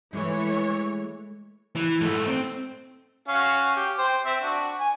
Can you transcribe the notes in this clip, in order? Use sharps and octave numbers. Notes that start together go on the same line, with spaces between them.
E3 G#3 A3 C#5
E3
G#2 A3
C4
C#4 F#4 F5
G4
C5 G5
C4 E5
D4 F#4
G#5